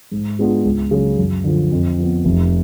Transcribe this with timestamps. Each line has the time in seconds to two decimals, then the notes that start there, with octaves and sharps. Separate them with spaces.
0.12 G#2
0.39 G#3 B3 D4 F4
0.65 C#2
0.91 C#3 F#3
1.18 F#2
1.44 D3 F3
1.71 F2
1.98 F3 B3
2.25 F1